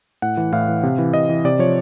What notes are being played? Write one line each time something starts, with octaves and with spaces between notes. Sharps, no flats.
A2 F#5
E3
A2 F5
E3
C3
E3
C3 D#5
E3
C3 D5
F3 C#5